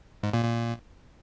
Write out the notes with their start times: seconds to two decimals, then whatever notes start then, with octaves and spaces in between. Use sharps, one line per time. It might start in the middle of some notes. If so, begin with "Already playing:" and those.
0.23 G#2
0.34 A#2
0.44 A#2